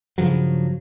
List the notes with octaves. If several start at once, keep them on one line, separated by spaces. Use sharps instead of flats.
G2 C#3 F3 F#3